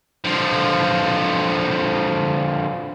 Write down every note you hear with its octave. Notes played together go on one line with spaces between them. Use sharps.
D3 F3